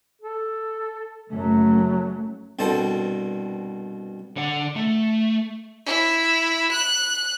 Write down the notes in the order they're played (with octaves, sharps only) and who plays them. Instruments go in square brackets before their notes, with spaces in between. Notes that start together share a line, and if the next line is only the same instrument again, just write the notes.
[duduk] A4
[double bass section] F#1 F#2 A3 [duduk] F#3
[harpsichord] C2 G2 B2 A4 C5
[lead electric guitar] D3 F#5
A3
[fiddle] E4
F#6